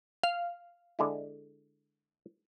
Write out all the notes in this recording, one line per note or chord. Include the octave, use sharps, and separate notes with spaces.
F5
D3 G#3 E4